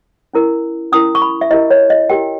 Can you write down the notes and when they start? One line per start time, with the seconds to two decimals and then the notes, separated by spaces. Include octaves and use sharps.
0.34 C#4 E4 A#4
0.92 C#4 E4 A#4 D#6
1.15 C#6
1.22 B5
1.41 E5
1.51 E4 G4 A#4 D#5
1.71 C#5
1.90 D#5
2.10 E4 G4 A#4 G5